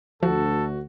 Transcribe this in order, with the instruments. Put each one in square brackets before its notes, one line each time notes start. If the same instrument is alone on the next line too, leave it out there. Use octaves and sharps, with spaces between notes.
[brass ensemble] D2 [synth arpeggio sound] F3 [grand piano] F#4 [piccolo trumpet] A4